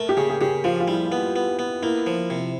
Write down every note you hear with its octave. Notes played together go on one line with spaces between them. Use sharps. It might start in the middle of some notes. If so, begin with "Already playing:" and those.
Already playing: A3 A#4
G4
C#3 G#4
G#4
C#3 G4
F3 F4
F4
G3 E4
B3
B3
B3
A#3 E4
F3
C3